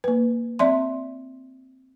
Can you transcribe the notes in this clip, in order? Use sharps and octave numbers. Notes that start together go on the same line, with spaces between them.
A#3 B4
C4 D5 E5 C6